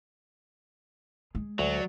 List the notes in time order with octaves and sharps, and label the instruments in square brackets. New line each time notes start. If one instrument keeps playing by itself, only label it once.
[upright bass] G#3
[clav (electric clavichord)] D2 [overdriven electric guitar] F#3 [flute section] D5